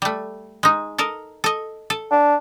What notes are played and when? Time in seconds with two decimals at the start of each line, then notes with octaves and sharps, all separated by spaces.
0.02 G3 A3
0.63 G#3 D#4
0.98 A4 A#4 D#5
1.44 A4 D#5
1.90 A4
2.11 D4